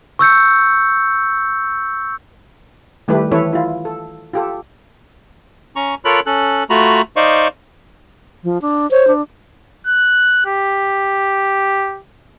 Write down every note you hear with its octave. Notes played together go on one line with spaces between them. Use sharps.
C#6 E6 G6 C#7
D#3 G3 A3 E4 G4 B4
E3 C4 E4 A4 B4 C#5
E4 F4
A4
F4 G4 A4
C#4 A#5 C#6
F4 A4 A#4 C#5 B5 F#6
C#4 A4 F#6
A3 F4 F#4 A#5 B5
D#4 C5 D5 D#5 F5 C#6
F3
D4
C5 C#5
D4
F#6
G4